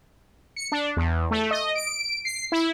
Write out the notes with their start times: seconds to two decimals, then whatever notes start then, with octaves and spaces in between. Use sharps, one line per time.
0.56 C#7
0.72 D4
0.97 E2
1.31 A3
1.51 D#5
1.75 D7
2.25 C7
2.52 E4